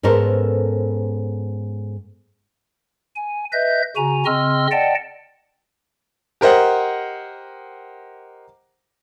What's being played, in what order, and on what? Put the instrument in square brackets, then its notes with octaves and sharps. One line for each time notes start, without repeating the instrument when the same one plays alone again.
[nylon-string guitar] G#2 B3 C#4 A4 A#4 C5
[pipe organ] G#5
B4 D#5 E5 G6
C#3 F#4 G#5 A#5
C#3 C4 D#5 C6 E6 F6
D5 D#5 F#5 G5 A5
[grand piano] G4 A#4 C5 D#5 F#5